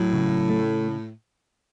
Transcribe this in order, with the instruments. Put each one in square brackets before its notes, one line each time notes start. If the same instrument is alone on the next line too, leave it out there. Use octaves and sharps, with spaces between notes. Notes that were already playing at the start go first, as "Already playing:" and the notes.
Already playing: [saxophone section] A2 [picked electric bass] F#3
[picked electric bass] C#3
A3